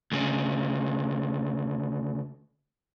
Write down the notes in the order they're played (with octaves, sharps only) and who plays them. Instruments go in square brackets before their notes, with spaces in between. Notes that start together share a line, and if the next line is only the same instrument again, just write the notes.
[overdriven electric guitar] D2 C#3